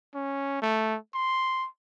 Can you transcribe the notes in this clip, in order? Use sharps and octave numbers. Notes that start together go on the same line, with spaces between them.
C#4
A3
C6